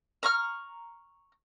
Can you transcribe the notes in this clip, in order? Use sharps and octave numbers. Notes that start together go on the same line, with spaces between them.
A#5 C#6 F6